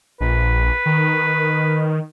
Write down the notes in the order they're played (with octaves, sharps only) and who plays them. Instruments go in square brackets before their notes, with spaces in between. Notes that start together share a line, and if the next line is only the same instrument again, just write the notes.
[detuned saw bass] A#1 [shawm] B4
[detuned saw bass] D#3